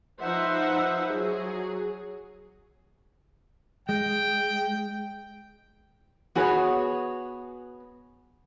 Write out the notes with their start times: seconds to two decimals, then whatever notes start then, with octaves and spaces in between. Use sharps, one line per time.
0.20 F3 D#4 B4 C5 E5 F#5
1.11 F#3 G#4
3.89 G#3 G5
6.35 B3 F#4 G#4 B4 C#5